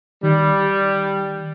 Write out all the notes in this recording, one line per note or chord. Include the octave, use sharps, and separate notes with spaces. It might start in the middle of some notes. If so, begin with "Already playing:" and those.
D#3 G3